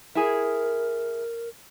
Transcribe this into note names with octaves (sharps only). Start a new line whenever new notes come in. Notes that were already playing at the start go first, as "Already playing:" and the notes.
E4 G#4 A#4